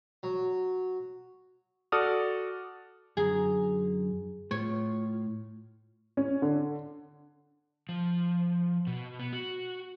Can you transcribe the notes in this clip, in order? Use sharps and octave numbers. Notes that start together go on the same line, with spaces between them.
F#3
F#4 A4 D5 D#6 F6
F#2 D3 G#4 A#5
A2 F4 C#5
C#4
D3
F3
B2
B3
F#4